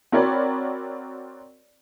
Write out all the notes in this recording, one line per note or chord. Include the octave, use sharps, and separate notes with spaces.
C4 F#4 A#4 C#5 D5 B5